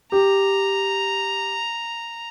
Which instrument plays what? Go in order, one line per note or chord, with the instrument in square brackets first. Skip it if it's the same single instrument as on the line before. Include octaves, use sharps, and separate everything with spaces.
[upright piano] G4 [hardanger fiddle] A#5